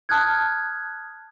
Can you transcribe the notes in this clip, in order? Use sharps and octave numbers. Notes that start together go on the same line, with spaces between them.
A5 D#6 F6 F#6 G#6